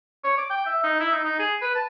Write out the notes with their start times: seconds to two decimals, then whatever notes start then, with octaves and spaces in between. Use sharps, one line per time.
0.24 C#5
0.37 D6
0.50 G5
0.66 E5
0.84 D#4
1.00 E4
1.12 D#4
1.24 D#4
1.39 G#4
1.61 B4
1.75 A5